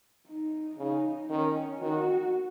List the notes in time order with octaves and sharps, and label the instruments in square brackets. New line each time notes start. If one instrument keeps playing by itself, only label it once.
[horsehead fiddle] D#4
[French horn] C#3 [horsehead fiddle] D#4
[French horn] D#3 [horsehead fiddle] C#4
[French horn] D#3 [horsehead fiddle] F#4